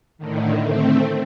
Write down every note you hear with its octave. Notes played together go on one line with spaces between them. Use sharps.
A2 D3 D#3
A3 C4